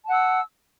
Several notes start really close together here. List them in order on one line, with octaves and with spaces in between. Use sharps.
A5 F#5 E6